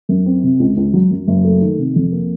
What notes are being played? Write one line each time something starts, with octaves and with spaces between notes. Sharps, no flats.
F#2
C4
C3
C#2
C#2
F#3
F#2
F#1
A3
D#3
C3
F2
A#3